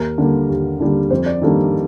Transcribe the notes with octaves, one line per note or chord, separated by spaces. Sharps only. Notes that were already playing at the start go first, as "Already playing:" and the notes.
Already playing: D#2 A#4
D3 G3 A#3
D#2
D3 G3 A#3
F2 C5
D5
D#3 G3 A#3 D4 A4